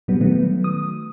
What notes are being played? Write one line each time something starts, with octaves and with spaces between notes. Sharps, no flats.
A#2 F#3 G3 B3
D#3 F#3 A3 B3
D#6